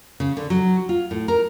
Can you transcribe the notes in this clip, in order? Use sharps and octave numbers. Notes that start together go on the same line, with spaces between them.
C#3
D3
F#3
F4
A2
A#4